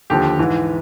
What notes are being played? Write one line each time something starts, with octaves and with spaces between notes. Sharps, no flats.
D#2 D3 F3 G4
G#2 E3